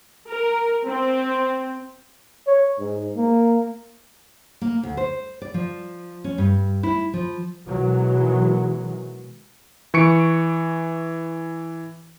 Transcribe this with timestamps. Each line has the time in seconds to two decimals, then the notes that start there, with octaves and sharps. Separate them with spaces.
0.27 A#4
0.86 C4
2.47 C#5
2.79 G#2
3.16 A#3
4.61 A#3
4.83 D2
4.97 C5
5.42 D5
5.54 F3
6.24 C#4
6.38 G2
6.83 E4
7.13 F3
7.66 B2 D#3 E3 F#3 G#3
9.94 E3 C#6 C#7 D7